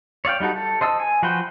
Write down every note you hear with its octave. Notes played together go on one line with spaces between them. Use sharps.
C#5 D5 F5 G5
G3 D#4 F#4 A4
A4
C5 D#5 A5 E6
G#5
F3 F#4 B4 C5 G5